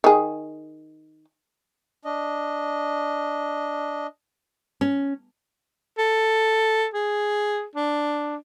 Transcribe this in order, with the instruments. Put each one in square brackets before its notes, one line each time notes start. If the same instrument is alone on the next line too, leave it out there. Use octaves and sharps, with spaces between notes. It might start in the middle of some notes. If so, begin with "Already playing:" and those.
[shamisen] D#3 G#4
[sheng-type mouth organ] D4 D#5
[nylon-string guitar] C#4
[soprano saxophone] A4
G#4
D4